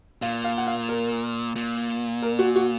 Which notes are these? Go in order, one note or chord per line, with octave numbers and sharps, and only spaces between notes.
A#2 F5
F5
F#5
F5
A#4
A#2
A#4
F#4
F#4